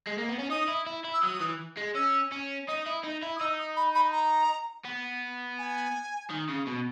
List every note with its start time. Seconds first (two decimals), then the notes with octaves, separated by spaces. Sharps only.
0.07 G#3
0.18 A#3
0.29 B3
0.39 C#4
0.50 D#4 D#6
0.68 E4
0.87 E4
1.04 E4
1.14 E6
1.22 F#3 D#6
1.40 E3
1.77 G#3
1.95 C#4 E6
2.32 C#4
2.68 D#4 D#6
2.86 E4
3.04 D#4
3.22 E4
3.36 D#6
3.41 D#4 E6
3.59 D#6
3.76 B5
3.95 B5
4.13 A#5
4.85 B3
5.59 G#5
6.31 D#3
6.49 C#3
6.67 B2